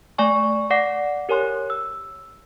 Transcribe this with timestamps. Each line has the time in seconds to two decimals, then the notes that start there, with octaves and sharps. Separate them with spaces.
0.18 A3 D5 G#5 C#6
0.71 D5 F#5 D6 A#6 C7
1.29 G4 A#4 C#5 G#5 C6 F#6
1.70 E6